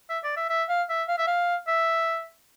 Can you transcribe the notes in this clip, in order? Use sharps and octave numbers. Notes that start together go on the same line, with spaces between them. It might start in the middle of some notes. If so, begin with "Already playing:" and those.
E5
D5
E5
E5
F5
E5
F5
E5
F5
E5